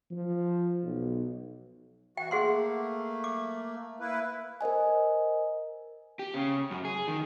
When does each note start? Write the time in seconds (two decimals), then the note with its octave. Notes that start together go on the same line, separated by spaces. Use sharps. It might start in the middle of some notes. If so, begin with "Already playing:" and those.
0.11 F3
0.83 B1
2.17 E3 F#4 G5
2.31 A3 A#3 G#4 F#5 C6
3.24 D6
4.00 A#3 E4 B4
4.61 A#4 C5 D#5 G#5
6.19 G4
6.34 C#3
6.71 F#2
6.85 G#4
7.07 D#3